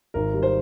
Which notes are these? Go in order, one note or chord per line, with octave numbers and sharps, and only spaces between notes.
G#1 A#4
G3
C5